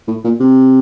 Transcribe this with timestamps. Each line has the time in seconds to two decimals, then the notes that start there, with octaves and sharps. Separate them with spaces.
0.08 A2
0.24 A#2
0.40 C3